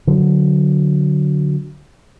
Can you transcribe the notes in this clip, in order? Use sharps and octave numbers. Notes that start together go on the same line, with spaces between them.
D3 F#3